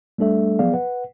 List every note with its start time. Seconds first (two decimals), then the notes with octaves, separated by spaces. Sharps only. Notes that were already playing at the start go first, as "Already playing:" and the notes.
0.18 G3 A3 D4 A4 E5
0.59 F3 F#3 B3 G#4 D5 F5
0.73 B4 F#5